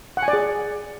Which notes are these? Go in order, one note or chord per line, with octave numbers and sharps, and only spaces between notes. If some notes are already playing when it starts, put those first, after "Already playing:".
F#5
G#5
D5
G#4